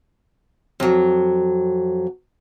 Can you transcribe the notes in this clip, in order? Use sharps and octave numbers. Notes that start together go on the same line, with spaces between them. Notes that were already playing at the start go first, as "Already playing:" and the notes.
F2 F#3